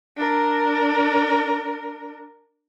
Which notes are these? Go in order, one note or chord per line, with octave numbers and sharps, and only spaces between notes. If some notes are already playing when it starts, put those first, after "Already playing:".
D4 A#4